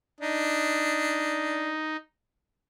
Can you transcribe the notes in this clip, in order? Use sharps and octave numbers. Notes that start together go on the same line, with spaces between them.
D4 D#4